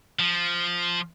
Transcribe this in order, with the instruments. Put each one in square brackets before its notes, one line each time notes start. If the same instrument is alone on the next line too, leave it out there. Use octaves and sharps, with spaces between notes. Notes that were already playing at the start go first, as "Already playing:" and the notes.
[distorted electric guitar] F3